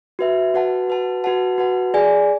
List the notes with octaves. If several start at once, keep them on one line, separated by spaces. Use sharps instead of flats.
F#4 B4 E5
F#4 B4 F#5 A5
F#4 B4 F#5 A5
F#4 B4 F#5 A5
F#4 B4 F#5 A5
G#4 D5 G#5